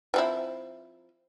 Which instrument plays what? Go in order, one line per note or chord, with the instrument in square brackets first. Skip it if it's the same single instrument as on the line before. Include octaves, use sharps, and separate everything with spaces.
[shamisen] F3 C4 E4